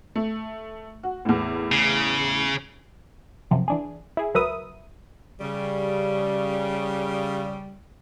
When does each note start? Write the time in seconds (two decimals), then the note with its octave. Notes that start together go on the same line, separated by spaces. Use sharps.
0.15 A3
1.03 F#4
1.25 E2 A2
1.72 C#3
3.51 F#2 C3 F3
3.68 E3 D4 G#4
4.17 E4 G#4
4.34 C#2 F#3 A#4 B4 E5 D#6
5.41 C#3 G3